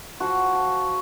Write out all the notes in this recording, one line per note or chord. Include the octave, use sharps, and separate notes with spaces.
F3 F#4
F3